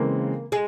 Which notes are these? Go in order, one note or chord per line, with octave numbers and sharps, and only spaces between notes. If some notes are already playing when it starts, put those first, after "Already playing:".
Already playing: C#3 E3 G#3 A#3 C4
G#3